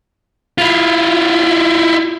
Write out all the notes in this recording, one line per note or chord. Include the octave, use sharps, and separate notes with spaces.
E4 F4